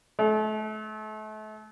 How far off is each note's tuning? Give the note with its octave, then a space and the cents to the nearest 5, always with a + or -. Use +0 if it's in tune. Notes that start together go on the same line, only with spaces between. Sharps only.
A3 -35